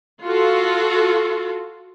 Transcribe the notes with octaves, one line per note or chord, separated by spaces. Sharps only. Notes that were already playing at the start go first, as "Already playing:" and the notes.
F4 F#4 A4